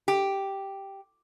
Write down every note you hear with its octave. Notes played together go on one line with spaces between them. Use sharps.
G4